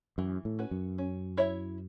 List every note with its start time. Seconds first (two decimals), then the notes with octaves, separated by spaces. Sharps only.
0.18 F#2 E3
0.45 A2
0.59 C#4 F#4 B4
0.71 F#2
0.98 C#4
1.37 E4 C#5 E5